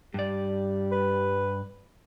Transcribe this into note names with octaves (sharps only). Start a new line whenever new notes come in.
G2 G3 D5
B4